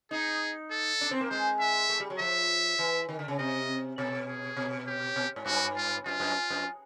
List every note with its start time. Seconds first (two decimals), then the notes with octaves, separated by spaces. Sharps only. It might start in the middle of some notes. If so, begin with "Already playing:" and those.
0.11 D#4 G#4
0.71 A4
1.01 D4
1.11 C4
1.21 A#3
1.30 G#3 C5
1.60 E5
1.89 A3
2.00 G3
2.10 F#3
2.20 F3 E5
2.79 E3
3.09 D#3
3.19 D3
3.28 C#3
3.39 C3 D#5
3.98 B2 A4
4.28 G#4
4.57 B2
4.87 G4
5.16 B2
5.36 G#2
5.46 G2 F#4
5.76 F4
6.06 F#2 F4
6.20 F#2
6.50 F#2